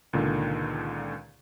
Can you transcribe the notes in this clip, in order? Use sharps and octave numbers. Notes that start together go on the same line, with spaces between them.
C#2 A#2 D3 D#3